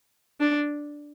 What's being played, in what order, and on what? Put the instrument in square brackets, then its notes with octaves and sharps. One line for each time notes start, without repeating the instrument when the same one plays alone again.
[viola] D4